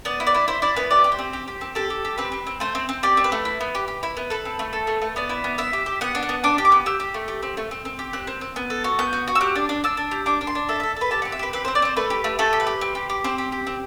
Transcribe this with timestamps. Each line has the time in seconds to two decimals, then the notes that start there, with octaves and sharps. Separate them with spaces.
0.05 B3 D5
0.20 E4
0.27 D5
0.35 E4
0.48 E4 C5
0.62 E4 D5
0.76 B3 B4
0.91 G4 D5
1.04 G4
1.12 C5
1.19 C4
1.33 G4
1.48 G4
1.61 C4
1.75 G4 A4
1.90 G4
2.05 G4
2.18 C4 B4
2.32 C4
2.47 C4
2.60 A3 C5
2.75 C4
2.89 C4
3.03 G4 D5
3.17 C4
3.24 B4
3.32 A3
3.45 E4
3.61 B3
3.75 G4
3.88 G4
4.03 E4
4.17 B3
4.30 A4 B4
4.45 C4
4.59 A3
4.73 A4
4.87 A3
5.02 A3
5.16 B3 D5
5.29 E4
5.44 B3
5.58 E4 E5
5.73 G4
5.86 G4
6.01 B3 F#5
6.15 D4
6.23 F#5
6.29 B3
6.44 D4 D6
6.58 G4
6.65 D6
6.72 B3
6.86 G4 E6
7.00 G4
7.14 A3
7.28 G4
7.43 C4
7.57 A3
7.71 C4
7.85 C4
7.99 G4
8.13 C4 F#6
8.27 C4
8.41 C4
8.56 B3
8.70 A4
8.84 F#4
8.99 B3 G6
9.13 F#4
9.28 F#4
9.35 E6
9.41 G4 F#6
9.55 D4
9.69 D4
9.84 D4 E6
9.97 D4
10.11 G4
10.26 D4 D6
10.41 D4
10.47 C6
10.55 D4
10.69 A4 E5
10.80 A4 E5
10.96 A4 B4
11.11 G4 A5
11.22 C4 F#5
11.32 E5
11.39 G4 B4
11.53 C4 B4
11.65 C4 C5
11.75 D5
11.82 C4 C5
11.97 A3 B4
12.10 G4
12.24 A3
12.39 A3 A4
12.53 G4
12.60 B4
12.67 G4
12.81 C4
12.95 G4
13.10 G4
13.24 C4 C5
13.38 G4
13.52 G4
13.67 C4